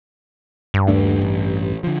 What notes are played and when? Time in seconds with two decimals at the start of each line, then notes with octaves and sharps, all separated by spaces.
0.74 G2
0.88 D#2 A3 D4
1.21 A1
1.84 D3 F3